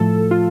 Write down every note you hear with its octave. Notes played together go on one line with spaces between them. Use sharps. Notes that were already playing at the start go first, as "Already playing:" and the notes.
Already playing: A2 F3 A3 A4
F4